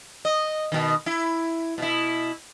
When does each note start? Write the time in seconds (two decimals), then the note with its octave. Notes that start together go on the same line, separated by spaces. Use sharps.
0.25 D#5
0.72 B2 D#3
1.06 E4
1.78 B2 E4